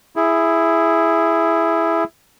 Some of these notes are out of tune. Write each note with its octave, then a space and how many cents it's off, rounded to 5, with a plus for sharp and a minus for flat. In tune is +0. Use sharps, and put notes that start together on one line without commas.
E4 +5 G#4 +0